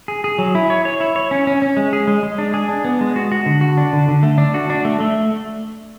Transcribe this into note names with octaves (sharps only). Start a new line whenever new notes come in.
G#4
G#4
F#3
E4
C#5
C#5
E4
C#5
C#4
C#4
C#4
G#3
G#4
G#3
G#3
D4
G#4
D4
B3
G#3
F#4
F#4
D3
F#4
D4
D3
D3
A3
D4
F#4
D4
A3
A3